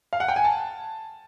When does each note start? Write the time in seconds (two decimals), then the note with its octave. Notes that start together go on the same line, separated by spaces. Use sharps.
0.13 F5
0.20 F#5
0.28 G5
0.36 G#5
0.44 A5